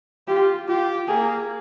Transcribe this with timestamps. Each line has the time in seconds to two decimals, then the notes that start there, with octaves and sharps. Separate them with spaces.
0.28 F4 G4
0.68 F4 G4
1.08 A#3 G#4